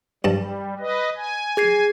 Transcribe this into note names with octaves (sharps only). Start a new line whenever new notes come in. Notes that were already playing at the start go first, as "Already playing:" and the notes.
G2 G3 A5
B4 D#5
G#5
G#4 G#6 C7